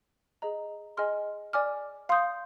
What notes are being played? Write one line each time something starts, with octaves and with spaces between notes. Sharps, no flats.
G#4 D#5 A#5
G#4 D#5 G#5 C6 F6
D5 G#5 D6 F6
F5 C6 D#6 G6